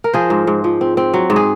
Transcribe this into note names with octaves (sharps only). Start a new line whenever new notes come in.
A#4
F3 G#4 C5
G#2
G#2
F3
C4
C4
F#3
G#2
G#4